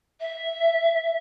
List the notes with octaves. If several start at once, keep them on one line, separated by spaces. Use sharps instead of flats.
E5